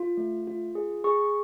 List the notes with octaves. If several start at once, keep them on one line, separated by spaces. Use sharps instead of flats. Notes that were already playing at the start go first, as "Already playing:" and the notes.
Already playing: F4
A3
F4
G#4
G#4 C#6